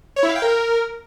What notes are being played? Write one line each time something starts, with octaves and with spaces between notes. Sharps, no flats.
C#5
E4
F5
G5
A#4